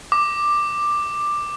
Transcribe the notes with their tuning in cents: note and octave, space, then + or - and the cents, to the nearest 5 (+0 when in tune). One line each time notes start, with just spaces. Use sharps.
D6 +10